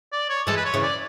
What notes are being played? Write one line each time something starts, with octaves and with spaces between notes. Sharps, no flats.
D5
C#5
E3 G#3 A4
B4
C#5
C#3 E3
D5